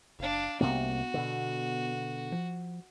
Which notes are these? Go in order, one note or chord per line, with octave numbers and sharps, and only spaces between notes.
F#1 D4 F5
C2 C3 A#3 B3 F#4
B2 D3
F3